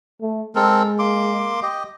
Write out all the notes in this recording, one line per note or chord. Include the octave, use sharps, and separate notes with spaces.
A3
G#3 C4 A4 A#4
A#3 C6 D6
G4 D#5